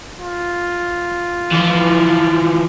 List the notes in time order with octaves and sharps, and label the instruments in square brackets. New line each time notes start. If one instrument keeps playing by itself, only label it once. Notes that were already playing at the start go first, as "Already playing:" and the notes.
[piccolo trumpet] F4
[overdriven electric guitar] E3 F3